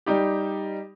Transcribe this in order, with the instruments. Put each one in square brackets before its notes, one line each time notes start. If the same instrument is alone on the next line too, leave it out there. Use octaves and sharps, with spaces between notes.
[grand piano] G3 D#4 G4